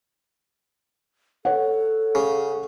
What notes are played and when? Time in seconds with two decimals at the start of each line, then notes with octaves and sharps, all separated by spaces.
1.45 A4 C#5 F#5
2.15 C#3